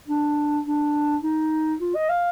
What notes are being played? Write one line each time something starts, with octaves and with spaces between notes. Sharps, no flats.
D4
D4
D#4
F4
D#5
F5